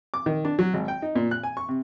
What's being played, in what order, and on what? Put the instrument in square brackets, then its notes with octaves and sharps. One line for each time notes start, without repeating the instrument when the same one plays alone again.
[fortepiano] D6
D#3
D4
F#3
G#1
G5
D#4
A#2
F#6
G#5
C#6
C3